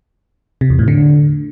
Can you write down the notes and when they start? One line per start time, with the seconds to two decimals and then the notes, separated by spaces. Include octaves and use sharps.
0.61 C3
0.70 E2
0.79 A2
0.88 D3